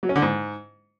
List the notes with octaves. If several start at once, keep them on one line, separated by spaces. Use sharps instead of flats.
F#3
C#4
D3
G#2